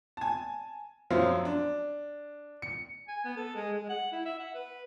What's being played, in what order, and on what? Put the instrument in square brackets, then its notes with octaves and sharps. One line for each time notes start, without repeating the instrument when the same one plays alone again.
[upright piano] G#5 A5
F#2 F3 F#3 C5 E5 F5
D4
C#7
[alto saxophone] G#5
B3
A4
G#3
G#3
F#5
E4
E5
F#5
B4